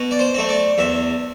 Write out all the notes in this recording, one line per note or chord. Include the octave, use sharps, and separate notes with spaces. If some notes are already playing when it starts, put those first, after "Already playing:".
Already playing: B2
D5
C5
A3 C4
D5
E2 E5